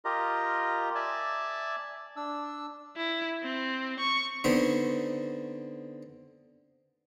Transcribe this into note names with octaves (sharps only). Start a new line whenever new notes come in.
F4 G4 A#4 D#5 A#5
D5 E5 G#5 A5
D4 E6
E4
C4
C#6
D3 B3 C4 D#4